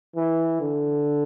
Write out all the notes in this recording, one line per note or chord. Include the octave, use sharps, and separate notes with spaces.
E3
D3